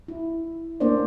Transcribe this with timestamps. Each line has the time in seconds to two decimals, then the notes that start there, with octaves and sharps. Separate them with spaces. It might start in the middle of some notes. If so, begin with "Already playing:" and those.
0.08 E4
0.80 A3 A#3 C#4 D4 C5 D5